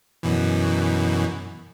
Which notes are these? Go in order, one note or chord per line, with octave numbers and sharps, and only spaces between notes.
F#2 B2 E3